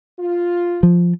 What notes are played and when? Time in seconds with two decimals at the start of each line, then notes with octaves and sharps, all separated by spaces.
0.18 F4
0.83 F3